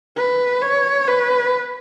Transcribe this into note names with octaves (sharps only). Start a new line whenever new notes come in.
B4
C#5
B4